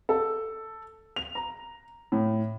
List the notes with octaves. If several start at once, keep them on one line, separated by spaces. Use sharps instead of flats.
A4
F7
A#5
A2